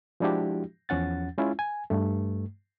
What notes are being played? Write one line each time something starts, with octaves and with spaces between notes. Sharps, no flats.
F3 G#3 D4 E4 F#4 G4
E2 F3 C#4 F#5 A6
G#3 C#4 E4 F4
G#5
G2 A3